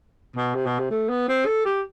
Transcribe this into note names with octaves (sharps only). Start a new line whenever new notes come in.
B2
C3
B2
C3
A3
B3
C4
A4
G4